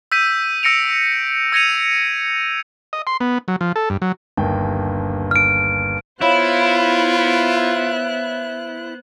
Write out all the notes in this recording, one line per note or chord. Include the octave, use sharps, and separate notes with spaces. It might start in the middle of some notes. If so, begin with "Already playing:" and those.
E6 G6 B6 D#7
E6 A#6 C#7 D7 F7
E6 G#6 A#6 C#7 D#7 F7
D#5
C6
B3
F#3
F3
A4
G2
F#3
G1 D#2 G5
F6 D7
B3 E4 F4 C5 C#5 F5 B5 F#6